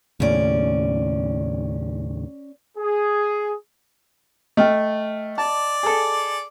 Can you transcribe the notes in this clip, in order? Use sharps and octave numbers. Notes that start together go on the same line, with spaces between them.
D#2 A2 C#3 C#4 D5
G#4
A3 D#5 G5 F6
D5 A5
G#4 A4